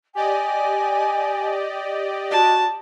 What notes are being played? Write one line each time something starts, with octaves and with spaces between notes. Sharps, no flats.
G4 D5 D#5 G#5
F#4 A5